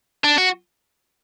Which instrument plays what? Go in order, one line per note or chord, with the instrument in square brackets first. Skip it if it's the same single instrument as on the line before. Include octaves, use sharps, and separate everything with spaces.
[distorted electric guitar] D4
F#4